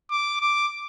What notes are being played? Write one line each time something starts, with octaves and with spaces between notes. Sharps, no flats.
D6
D6